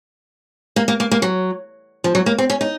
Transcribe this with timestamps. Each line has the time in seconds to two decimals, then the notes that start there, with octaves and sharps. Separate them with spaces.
0.76 A#3
0.88 A#3
1.00 A#3
1.11 A#3
1.22 F#3
2.04 F3
2.15 F#3
2.26 A#3
2.38 C4
2.50 C#4
2.61 D#4